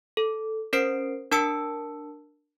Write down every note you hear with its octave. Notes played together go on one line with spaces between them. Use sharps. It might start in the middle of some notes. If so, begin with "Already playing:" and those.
A4
C#4 A#4 C5 C7 D7
D4 A#4 A5 E6 C#7